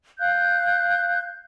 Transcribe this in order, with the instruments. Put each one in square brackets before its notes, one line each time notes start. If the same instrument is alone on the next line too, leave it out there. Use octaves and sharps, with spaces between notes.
[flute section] F5 F#6 G6